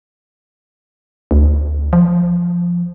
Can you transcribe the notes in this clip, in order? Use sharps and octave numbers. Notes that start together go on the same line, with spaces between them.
D2
F3